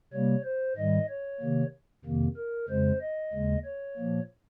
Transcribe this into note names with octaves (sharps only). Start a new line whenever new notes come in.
C3 G3 A#3 C#5
C5
G#2 D#3 G3 D#5
C#5
C3 D#3 A#3
F2 C3 D#3 A#3
A#4
F2 C#3 G#3 C5
D#5
D#2 C#3 G#3
C#5
A#2 F3 A#3